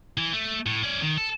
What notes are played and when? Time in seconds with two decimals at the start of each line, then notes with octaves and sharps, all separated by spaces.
0.18 E3
0.33 A3
0.66 A2
0.83 C#4 D5
1.01 D#3
1.17 A4